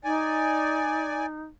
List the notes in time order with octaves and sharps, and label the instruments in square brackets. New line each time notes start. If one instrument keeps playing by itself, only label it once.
[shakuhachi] D#4 [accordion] D5 G#5